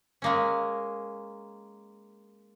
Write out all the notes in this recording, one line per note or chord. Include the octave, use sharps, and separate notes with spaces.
G#3 A#3 C#4